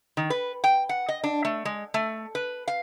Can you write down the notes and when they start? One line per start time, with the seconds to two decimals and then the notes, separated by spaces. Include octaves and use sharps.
0.17 D#3
0.30 B4
0.64 G5
0.89 F#5
1.09 D#5
1.24 D4
1.45 A3
1.65 G#3
1.94 A3
2.35 B4
2.68 F5